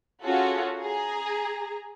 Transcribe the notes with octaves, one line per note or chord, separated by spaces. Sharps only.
C#4 F4 F#4 G#4 A4
G#4 A#5